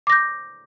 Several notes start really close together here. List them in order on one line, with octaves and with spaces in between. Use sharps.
D6 A#6 G6